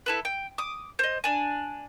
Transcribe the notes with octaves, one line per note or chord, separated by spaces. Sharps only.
E4 A4 B4
G5
D6 D#6
C5 D#5
D4 G#5